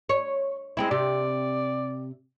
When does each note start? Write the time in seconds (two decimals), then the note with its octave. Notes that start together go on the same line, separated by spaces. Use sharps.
0.09 C#5
0.77 G#3 C4 E4
0.91 C3 G4 D5